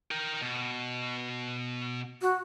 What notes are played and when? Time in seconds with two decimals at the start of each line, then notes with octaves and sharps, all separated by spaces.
0.11 A#4 G5
0.41 B2
2.22 F#4